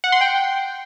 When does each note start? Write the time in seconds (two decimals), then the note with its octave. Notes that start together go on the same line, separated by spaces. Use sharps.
0.04 F#5
0.12 C6
0.21 G5